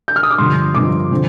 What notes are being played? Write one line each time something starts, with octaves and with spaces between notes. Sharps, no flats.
G6
F6
D#6
D6
G2 D3 F3 C6
G2 D3 F3 D6
D3 F3 C4